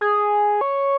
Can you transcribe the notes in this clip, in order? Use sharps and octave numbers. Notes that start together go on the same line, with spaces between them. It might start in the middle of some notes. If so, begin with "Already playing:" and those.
G#4
C#5